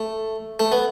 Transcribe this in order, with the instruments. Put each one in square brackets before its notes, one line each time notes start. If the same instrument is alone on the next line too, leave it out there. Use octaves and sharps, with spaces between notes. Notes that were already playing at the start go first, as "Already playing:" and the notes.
Already playing: [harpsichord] A3
A3
B3